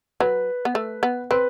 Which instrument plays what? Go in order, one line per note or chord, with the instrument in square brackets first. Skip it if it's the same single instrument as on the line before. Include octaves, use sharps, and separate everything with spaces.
[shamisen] F#3 [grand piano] B4
[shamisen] B3
A3
B3
[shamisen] C4 [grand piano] B4